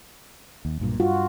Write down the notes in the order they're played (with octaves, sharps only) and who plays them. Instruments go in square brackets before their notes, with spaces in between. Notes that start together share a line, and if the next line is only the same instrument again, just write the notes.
[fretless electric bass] D#2
B1 G2 A#2
[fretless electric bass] G2 [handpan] F4 F#4